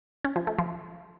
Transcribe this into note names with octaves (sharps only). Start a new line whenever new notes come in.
C#4
F3
A3
F3